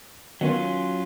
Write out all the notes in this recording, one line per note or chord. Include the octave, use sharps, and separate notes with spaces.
D#3 F#3 B3 C#4 F4